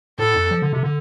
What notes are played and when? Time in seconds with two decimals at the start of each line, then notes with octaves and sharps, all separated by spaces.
0.18 A2 A4
0.35 F2
0.51 F3
0.62 D3
0.73 C3
0.83 D3